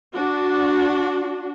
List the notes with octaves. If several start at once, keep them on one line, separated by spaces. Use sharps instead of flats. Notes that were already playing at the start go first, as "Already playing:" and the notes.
D4 F#4